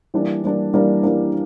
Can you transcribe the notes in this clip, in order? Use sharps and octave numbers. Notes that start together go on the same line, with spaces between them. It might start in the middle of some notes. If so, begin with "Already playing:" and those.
E3 G3 A#3 D4
E3 G3 A#3 D4
E3 G3 A#3 D4
E3 G3 A#3 D4